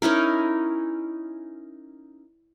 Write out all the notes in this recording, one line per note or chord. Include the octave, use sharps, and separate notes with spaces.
C#4 D#4 E4 A#4